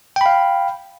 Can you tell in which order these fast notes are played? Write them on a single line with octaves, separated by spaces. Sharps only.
G5 B5 F5